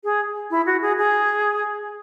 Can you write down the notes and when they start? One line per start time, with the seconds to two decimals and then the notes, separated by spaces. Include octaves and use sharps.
0.04 G#4
0.51 E4
0.66 F#4
0.82 G#4
0.98 G#4